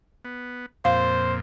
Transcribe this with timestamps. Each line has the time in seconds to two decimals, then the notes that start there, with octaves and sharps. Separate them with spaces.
0.25 B3
0.85 F2 A#2 C5 F5